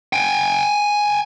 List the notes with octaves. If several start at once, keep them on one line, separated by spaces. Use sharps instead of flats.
G5 G#5